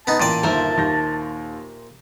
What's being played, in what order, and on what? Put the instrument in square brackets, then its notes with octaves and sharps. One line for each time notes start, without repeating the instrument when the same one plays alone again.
[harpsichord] B3 D#4 [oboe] A5
[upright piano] A1 G5 D#7 [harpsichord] A#2 D5
[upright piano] G1 D#2 [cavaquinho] A#4 C5 E5
[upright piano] D#2 G6 A#6